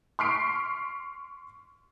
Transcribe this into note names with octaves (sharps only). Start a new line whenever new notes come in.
C6 C#6 F6 B6 C7 D7